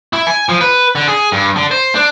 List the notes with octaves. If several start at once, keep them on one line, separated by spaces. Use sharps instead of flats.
E4
G#5
F3
B4
D3
G#4
G2
D3
C5
D4